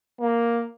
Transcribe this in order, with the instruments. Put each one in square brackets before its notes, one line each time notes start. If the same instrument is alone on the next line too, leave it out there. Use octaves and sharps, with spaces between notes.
[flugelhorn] A#3